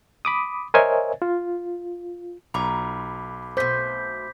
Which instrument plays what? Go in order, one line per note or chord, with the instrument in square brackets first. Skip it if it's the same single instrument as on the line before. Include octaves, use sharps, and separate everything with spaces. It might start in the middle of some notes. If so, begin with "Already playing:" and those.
[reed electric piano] B5 D6 D#6
A#4 C5 C#5 D#5 E5 G#5
F4
[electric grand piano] B1 [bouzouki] F4 C#5 A#5 [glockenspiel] B5 D6
[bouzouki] B2 A3 [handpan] C5 [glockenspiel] D6 G6 B6